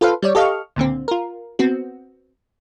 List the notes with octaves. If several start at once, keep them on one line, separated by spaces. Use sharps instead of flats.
F4 A4 B4 C5 F5
G3 C#5 D5
G4 A4 D#5 F5 C#6 F6
C#2 A#2 D3 C4
F4 A#4
B3 C4 F#4